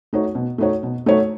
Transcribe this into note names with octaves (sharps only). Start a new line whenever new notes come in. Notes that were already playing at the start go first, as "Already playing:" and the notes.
A3 D#4 F#4 C#5
B2
A3 D#4 F#4 C#5
B2
A3 D#4 F#4 C#5